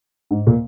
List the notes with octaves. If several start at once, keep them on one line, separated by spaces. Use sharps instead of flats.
G#2
A#2